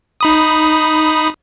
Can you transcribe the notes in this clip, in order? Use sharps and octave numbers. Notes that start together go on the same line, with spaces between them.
D#4 B5 D#6